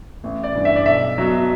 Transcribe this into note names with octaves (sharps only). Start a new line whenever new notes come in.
A1
D5
G2 E3
E5
D5
B1 E5
B2 F#3